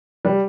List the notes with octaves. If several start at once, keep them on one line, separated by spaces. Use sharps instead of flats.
G3